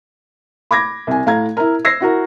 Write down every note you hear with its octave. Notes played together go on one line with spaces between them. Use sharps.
B5 D6 G#6 A#6
C2 G#5
A2 F5 A#5 G#6
E4 A#4
E6 G#6 A#6 C7
E4 F#4 A#4